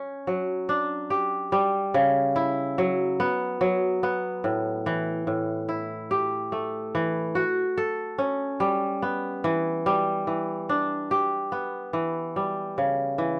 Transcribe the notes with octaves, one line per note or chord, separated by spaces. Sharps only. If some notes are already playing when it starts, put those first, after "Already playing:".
Already playing: C#4
F#3
D4
G4
G3
C#3
E4
F#3
B3
F#3
B3
A2
E3
A2
E4
G4
A3
E3
F#4
A4
C#4
G3
B3
E3
G3
E3
D4
G4
B3
E3
G3
C#3
E3